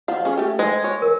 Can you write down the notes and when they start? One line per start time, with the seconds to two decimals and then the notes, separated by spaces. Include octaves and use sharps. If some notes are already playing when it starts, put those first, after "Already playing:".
0.08 F3 F5 F#5
0.25 C#4 G#4
0.38 A3 G4
0.59 G#3 C5
0.84 C#5
1.02 A#4